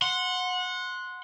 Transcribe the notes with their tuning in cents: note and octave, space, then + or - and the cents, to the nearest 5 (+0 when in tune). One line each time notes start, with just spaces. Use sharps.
F#5 -20 C6 -5